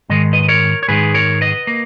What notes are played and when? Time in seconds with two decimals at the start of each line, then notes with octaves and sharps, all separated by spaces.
0.09 G#2 D#3 G#3 D#5
0.33 B4 D#5
0.48 A#4 C#5
0.83 C#5
0.88 G#2 D#3 G#3 G#4 B4
1.14 A#4 C#5
1.41 B4 D#5
1.67 A#3